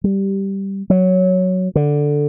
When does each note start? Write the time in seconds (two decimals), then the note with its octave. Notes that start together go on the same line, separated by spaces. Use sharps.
0.04 G3
0.90 F#3
1.75 D3